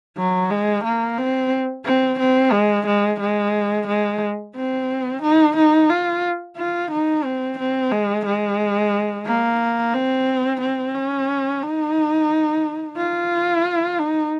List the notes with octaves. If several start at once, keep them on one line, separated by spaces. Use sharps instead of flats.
F#3
G#3
A#3
C4
C4
C4
G#3
G#3
G#3
G#3
C4
D#4
D#4
F4
F4
D#4
C4
C4
G#3
G#3
A#3
C4
C4
C#4
D#4
F4
D#4